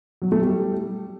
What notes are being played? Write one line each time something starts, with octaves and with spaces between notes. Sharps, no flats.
F#3
A3
G3